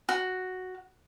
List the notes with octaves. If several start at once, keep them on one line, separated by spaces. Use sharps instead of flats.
F#4